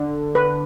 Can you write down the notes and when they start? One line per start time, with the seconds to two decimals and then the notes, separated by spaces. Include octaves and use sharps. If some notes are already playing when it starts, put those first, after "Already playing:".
Already playing: D3
0.35 B4